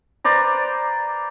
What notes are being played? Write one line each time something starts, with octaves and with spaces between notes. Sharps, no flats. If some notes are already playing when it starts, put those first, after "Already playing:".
B4 C5 D5 A#5